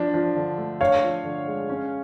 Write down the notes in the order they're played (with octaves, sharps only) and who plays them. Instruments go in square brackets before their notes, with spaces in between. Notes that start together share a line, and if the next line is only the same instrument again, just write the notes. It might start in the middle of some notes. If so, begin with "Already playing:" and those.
Already playing: [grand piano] F3 D4
F3
D3
A3
[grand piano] D4 [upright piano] C#5 F5
[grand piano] F3
D3
G#3
C#4